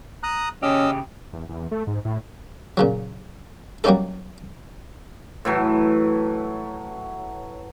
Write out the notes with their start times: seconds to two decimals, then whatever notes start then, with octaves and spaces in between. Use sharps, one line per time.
0.23 A#5 D#6 F#6
0.63 C#3 C#4 G4 D#5 F5 E6
1.33 E2
1.49 E2
1.71 A3
1.87 G#2
2.05 A2
2.77 A#2 C#3 F#3
3.84 F#3 G3 A#3 C#4 D#4 A4
5.45 A2 E3 F#3